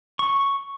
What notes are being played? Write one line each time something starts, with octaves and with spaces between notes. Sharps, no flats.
C#6